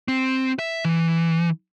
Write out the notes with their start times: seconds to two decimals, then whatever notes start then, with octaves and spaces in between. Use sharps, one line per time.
0.08 C4
0.59 E5
0.85 E3